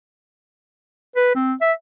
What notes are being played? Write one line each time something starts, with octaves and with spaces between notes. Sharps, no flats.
B4
C4
E5